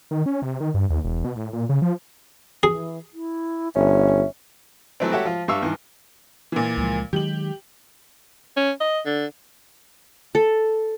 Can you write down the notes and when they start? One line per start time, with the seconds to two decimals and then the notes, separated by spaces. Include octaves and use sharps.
0.11 D#3
0.26 C#4
0.42 C3
0.60 D#3
0.74 G2
0.90 D#2
1.04 E1
1.24 B2
1.36 A2
1.53 A#2
1.69 C#3
1.82 F3
2.63 E3 G#4
3.14 E4
3.75 G1 C#4 E5
5.00 E3 F#3 A3 B3 C4
5.12 F#4 G4 A4 C#5 E5 F#5
5.25 F3 F4
5.48 G2 G3 E5 F5 C#6 E6
5.63 G2 D#3 E3
6.52 A#2 E3
6.77 C#2 F3 G#3
7.13 D#3 F#3 G#3 G4 F#7
8.57 C#4
8.80 D#5
9.05 D3
10.35 A4